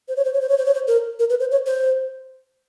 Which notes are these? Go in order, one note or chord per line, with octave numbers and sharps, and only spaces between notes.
C5
C#5
C5
C#5
C5
C#5
C5
C#5
C5
A#4
A#4
B4
C5
C#5
C5